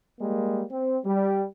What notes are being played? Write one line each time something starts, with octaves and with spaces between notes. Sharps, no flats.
G3 G#3 A#3
C4
G3